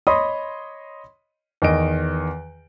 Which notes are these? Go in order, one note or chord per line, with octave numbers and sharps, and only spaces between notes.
C#5 D#5 B5 C6 D#6
E2 D#3 D#5 D7